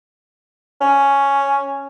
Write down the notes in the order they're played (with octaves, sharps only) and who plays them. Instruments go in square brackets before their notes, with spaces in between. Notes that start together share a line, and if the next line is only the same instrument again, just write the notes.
[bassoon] C#4